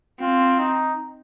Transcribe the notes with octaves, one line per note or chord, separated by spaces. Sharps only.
C4 F4
D#4